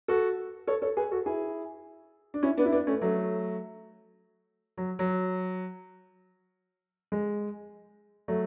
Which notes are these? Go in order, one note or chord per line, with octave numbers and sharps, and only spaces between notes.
F#4 A4
A4 C#5
A4 C#5
G#4 B4
F#4 A4
E4 G#4
D4
C#4 E4
B3 D4
E4
B3 D4
A3 C#4
F#3 A3
F#3
F#3
G#3
F#3 A3